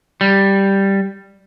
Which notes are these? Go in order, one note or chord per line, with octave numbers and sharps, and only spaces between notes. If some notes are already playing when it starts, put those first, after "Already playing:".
G3